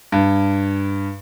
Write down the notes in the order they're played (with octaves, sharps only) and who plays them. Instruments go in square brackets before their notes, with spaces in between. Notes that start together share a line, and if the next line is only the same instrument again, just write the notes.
[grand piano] G2